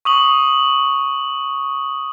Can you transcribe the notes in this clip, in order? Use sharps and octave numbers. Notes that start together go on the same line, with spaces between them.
C#6 D#6 F#7